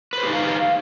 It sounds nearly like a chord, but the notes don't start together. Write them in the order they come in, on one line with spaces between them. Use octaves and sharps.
B4 C5 G4 D#4 F5